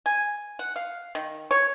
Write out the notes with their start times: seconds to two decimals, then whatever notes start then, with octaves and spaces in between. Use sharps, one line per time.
0.06 G#5
0.59 F#5
0.76 F5
1.15 D#3
1.51 C#5